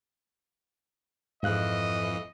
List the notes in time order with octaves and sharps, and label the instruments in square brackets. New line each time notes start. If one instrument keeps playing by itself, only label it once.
[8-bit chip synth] F2 E3 [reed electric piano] G#2 F5 F#6 [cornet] D#5